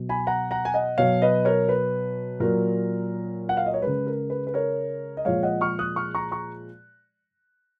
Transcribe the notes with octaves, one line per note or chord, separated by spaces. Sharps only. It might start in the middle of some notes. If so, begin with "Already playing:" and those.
Already playing: B2 F#3
G#5 B5
F#5 A#5
F#5 A#5
G#5
D#5 F#5
B2 F#3 C#5 F5
B4 D#5
A#4 C#5
B4
A#2 F#3 A#4
F#5
F5
D#5
C#5
C#3 G#3 B4
A#4
B4
B4
A#4 C#5
D#5
A#2 F3 G#3 C#5 F5
D#5 F#5
C#6 F6
D#6 F#6
C#6 F6
A#5 C#6
A#5 C#6